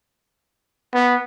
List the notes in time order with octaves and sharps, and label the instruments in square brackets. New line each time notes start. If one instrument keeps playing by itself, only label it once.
[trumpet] B3